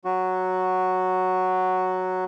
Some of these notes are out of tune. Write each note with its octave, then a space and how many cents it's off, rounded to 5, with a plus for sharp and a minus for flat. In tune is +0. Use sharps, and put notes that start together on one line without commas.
F#3 +0 F#4 +0